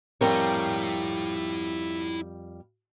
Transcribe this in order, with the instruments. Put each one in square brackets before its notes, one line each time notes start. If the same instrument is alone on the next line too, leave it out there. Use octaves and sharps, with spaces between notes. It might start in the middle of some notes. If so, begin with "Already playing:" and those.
[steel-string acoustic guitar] F2 G3 A#4 [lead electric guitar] E4 C#5